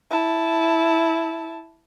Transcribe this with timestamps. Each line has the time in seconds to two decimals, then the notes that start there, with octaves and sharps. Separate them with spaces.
0.11 E4 A5